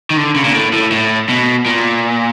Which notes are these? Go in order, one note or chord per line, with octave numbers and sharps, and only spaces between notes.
D#3
D3
C#3
A#2
A2
A2
A2
B2
A#2